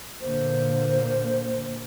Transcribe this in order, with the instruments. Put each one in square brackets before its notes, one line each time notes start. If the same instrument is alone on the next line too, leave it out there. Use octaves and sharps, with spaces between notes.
[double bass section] A#2 D3 A#3 [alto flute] C5